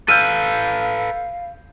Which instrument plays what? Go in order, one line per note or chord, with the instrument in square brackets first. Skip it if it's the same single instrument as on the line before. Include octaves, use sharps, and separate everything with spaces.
[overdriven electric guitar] A4 B4 [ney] F5 [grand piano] E6 F6 G6 [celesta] D#7